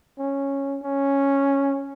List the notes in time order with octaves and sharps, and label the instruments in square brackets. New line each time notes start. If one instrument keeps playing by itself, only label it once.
[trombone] C#4
C#4